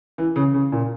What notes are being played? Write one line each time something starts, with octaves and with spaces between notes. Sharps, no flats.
E3
C#3
C#3
A#2